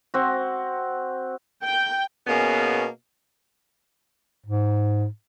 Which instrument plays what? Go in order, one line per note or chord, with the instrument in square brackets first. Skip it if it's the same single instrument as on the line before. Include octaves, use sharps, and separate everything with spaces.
[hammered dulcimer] C4 F#4
[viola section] G5
[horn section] B2 A#3 B3 C#4 G#4
[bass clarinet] G#2